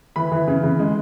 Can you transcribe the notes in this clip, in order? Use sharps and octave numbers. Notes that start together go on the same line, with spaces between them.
E3 B5
E3
C#3
C#3
G#3